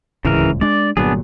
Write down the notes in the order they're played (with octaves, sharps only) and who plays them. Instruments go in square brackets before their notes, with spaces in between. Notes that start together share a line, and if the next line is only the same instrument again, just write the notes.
[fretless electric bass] D1 C#2 G#2 [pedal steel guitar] C#3 E3 A#4
[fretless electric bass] G#3 D4 [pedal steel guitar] D5
[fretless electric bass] G1 A#2 F#3 [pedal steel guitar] B3 D4 G#4